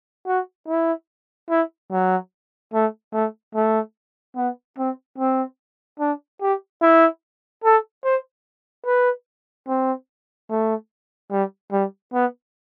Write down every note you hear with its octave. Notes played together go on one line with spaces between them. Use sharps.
F#4
E4
E4
F#3
A3
A3
A3
B3
C4
C4
D4
G4
E4
A4
C5
B4
C4
A3
G3
G3
B3